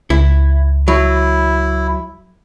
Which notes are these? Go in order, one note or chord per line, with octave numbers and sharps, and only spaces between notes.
C#2 E4
F#3 E4